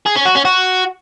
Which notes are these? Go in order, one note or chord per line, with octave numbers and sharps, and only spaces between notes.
G#4
C#4
F#4
C#4
F#4